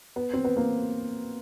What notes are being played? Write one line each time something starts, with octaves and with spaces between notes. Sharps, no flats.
B3
C4
B3
A#3